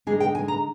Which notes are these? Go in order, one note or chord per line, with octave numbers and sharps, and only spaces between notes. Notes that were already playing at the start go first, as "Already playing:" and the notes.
D3 G#3 D#4 G#4
G5
G#5
A#5